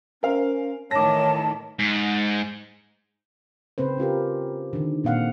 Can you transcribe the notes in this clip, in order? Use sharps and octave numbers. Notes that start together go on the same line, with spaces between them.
C#4 A#4 C5 F5
A2 D#3 E3 C#5 A5 D6 A#6
G#2
C#3 C4 B4 C5
C#4 F4 G4 A#4
D3 D#3
A#2 C4 F5 F#5